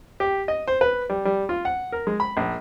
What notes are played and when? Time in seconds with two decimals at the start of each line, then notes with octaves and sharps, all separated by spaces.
0.20 G4
0.48 D#5
0.68 C5
0.81 B4
1.10 G3
1.25 G3
1.49 F4
1.65 F#5
1.92 A#4
2.07 G#3
2.20 B5
2.37 A#1